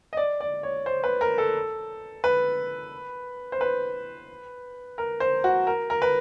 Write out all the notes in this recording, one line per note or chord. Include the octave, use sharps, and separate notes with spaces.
D#5
D5
D5
C#5
C5
B4
A#4
A4
B4
C5
B4
A#4
C5
F#4
A#4
A#4
B4